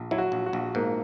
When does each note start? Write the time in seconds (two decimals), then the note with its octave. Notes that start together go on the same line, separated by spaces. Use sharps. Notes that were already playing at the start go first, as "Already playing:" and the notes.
Already playing: A#1
0.11 F#3 E4
0.18 F#4
0.32 A#1
0.46 F#4
0.53 A#1
0.75 G#2 A#3